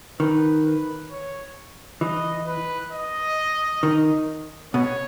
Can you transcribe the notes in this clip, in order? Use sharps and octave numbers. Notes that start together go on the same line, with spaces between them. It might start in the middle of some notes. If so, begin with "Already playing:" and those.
D#3 B4
B4
C#5
E3 D#5
B4
D#5
D#3
B2 C#5